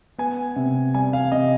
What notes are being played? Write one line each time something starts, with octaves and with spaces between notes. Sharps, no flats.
B3 G#5
C3
G3 G#5
F5
C3 D#5